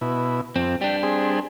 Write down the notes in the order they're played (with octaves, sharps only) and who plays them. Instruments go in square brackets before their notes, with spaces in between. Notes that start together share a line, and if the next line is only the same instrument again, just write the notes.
[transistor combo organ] B2 E4
[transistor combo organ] F2 [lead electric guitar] C4
[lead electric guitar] G3 D4 [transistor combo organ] G5
[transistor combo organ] C4 G#4